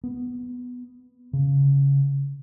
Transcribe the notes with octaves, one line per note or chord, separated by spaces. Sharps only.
B3
C#3